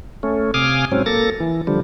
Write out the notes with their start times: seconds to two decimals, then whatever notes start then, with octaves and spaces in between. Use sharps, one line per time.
0.23 A3 C#4
0.54 C3 F5 G#5 D6 D#6 F6
0.92 G#2 F#3 C4 C#4
1.06 A#3 A4 A6 A#6
1.40 E3
1.67 D3 F3 G3